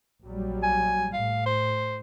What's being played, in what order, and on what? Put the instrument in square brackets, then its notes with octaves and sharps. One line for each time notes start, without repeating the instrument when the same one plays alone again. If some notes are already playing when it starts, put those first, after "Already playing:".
[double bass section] A#1 F#3 G3
[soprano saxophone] G#5
[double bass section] A2 [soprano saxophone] F5
[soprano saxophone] C5